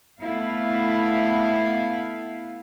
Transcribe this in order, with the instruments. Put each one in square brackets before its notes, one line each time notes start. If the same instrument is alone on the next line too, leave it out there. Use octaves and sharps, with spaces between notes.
[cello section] A3 B3 E4 F5